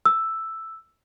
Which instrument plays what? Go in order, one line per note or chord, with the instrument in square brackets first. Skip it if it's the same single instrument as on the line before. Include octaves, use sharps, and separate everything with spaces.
[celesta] E6